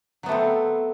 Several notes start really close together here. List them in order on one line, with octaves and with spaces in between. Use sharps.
F#3 B3 A3 C4